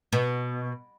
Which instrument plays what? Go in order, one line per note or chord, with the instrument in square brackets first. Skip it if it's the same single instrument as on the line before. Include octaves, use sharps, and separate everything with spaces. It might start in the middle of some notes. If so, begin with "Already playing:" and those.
[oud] B2